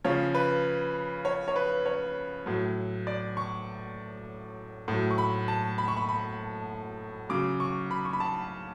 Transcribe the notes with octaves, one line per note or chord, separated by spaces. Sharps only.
C#3 F3 C#5
B4
C#5
C#5
B4
C#5
A2 F#3
D5
C#6
A2 F#3
C#6
B5
A5
B5
C#6
B5
B5
C#3 F#3 D6
C#6
B5
C#6
B5
A5